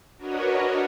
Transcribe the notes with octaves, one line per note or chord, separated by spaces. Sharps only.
D4 F#4 A#4 B4 C#5 D#5